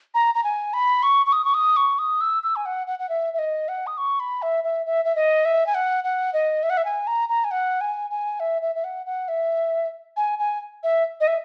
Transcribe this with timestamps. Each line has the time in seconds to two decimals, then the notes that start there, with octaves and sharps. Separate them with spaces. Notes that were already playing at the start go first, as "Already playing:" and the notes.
0.14 A#5
0.35 A#5
0.44 G#5
0.73 B5
1.03 C#6
1.26 C#6
1.32 D#6
1.44 C#6
1.54 D#6
1.77 C#6
1.99 D#6
2.21 E6
2.43 E6
2.56 G#5
2.66 F#5
2.87 F#5
2.99 F#5
3.09 E5
3.34 E5
3.39 D#5
3.68 F#5
3.87 D#6
3.98 C#6
4.20 B5
4.42 E5
4.64 E5
4.86 E5
5.05 E5
5.16 D#5
5.45 E5
5.67 G#5
5.75 F#5
6.04 F#5
6.33 D#5
6.63 E5
6.70 F#5
6.77 E5
6.85 G#5
7.07 A#5
7.29 A#5
7.44 G#5
7.51 F#5
7.81 G#5
8.10 G#5
8.40 E5
8.62 E5
8.75 E5
8.84 F#5
9.06 F#5
9.28 E5
10.17 G#5
10.39 G#5
10.83 E5
11.20 D#5
11.27 E5